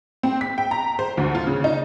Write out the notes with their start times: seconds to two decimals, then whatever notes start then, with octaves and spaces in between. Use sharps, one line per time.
0.23 C4
0.41 B6
0.58 G5
0.71 A#5
0.99 C5
1.17 D2
1.35 F4
1.47 C#3
1.64 D#4